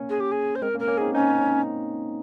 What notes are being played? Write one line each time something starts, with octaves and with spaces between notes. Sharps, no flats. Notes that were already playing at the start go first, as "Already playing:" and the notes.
Already playing: A#3 C#4
G#4
G4
G#4
C5
G#3 C4 A#4
A#3 C#4
A#4
A#3 C#4
C4 D#4 G#4
C4 C#4 D#4